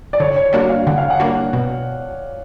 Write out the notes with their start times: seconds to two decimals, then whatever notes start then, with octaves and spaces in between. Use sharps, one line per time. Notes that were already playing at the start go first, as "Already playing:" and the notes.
0.13 D5
0.20 D3 C#5
0.36 C#5
0.53 G3 A#3 D4 F#4 D5
0.69 F5
0.87 D3 F#5
0.98 F5
1.10 F#5
1.20 G3 A#3 D4 F#4
1.53 B2